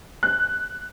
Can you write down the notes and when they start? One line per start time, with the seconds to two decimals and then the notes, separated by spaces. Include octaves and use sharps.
0.23 F#6